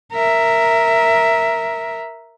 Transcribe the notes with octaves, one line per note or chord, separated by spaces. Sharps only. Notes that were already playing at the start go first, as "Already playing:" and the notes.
A#4 E5